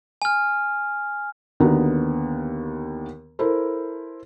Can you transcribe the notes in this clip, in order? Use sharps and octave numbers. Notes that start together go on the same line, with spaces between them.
G#5 F6
D#2 D3 B3 F#4 A#5
E4 A4 A#4 C5